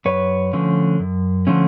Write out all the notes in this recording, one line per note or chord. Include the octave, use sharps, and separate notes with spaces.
F#2 B4 C#5
D3 F3 A3 C#4
F#2
D3 F3 A3 C#4